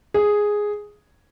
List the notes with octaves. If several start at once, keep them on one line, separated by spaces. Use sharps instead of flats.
G#4